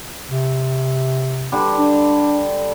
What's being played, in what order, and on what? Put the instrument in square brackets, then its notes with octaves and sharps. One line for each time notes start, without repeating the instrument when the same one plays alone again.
[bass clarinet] C3
[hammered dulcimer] D3 G3
[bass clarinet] D4